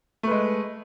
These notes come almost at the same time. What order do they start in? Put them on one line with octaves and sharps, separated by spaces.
A3 B4 G#3